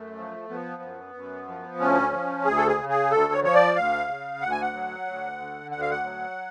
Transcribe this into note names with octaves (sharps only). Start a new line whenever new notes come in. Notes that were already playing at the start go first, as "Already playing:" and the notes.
Already playing: F#2 A3
F3
F3 B3
F#2
F#2
F3
D2 C#4
F3
D2 G#4
A4
G#4
C#3
G#4
D2 A4
C#5
F3 C#5
D5
D2 F5
C#3
D2 F#5
G#5
F#5
F#3
D2
D3
D2 F#5
F5
F#5
F#3